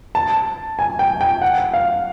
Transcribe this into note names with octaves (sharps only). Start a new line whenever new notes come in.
A5
G#5
G5
G5
F#5
F5